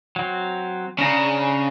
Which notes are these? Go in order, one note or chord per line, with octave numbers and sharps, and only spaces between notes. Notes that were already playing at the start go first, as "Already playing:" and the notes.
F#3 C4
C#3 C#4 D4 A#5